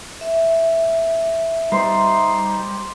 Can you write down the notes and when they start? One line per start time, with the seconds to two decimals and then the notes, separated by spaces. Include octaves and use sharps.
0.21 E5
1.72 G3 D#4 C5 C6